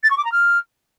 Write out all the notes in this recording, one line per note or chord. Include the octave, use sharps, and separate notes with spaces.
A6
C#6
D6
A#5
F6